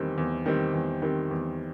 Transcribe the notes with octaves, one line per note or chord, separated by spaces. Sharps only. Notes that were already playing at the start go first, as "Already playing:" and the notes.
Already playing: E2 D#3 G3 C4
E2
D#3 G3 C4
E2
D#3 G3 C4
E2